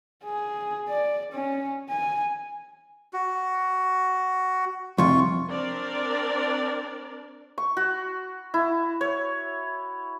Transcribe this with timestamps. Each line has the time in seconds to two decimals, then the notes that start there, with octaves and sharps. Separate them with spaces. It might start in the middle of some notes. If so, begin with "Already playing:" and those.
0.24 G#4
0.89 D5
1.33 C#4
1.90 G#5
3.13 F#4
4.98 C2 F2 F4 C#6
5.49 C4 D4 A#4 D5
7.58 C#6
7.77 F#4
8.54 E4
9.01 C#5